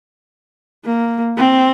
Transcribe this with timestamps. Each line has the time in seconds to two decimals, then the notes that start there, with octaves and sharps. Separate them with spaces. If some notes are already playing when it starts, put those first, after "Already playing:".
0.85 A#3
1.37 C4